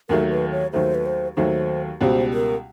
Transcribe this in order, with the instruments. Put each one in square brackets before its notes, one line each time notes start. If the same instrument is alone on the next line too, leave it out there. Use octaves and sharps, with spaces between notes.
[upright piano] D#2 D#3 F#3 A3 [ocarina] A#4
[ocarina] B4
C#5
[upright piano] D#2 D#3 F#3 A3 [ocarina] C5
[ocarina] B4
C5
[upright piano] D#2 D#3 F#3 A3 [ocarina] C5
[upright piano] C#2 B2 G3 [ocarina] C5 C#5
[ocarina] A#4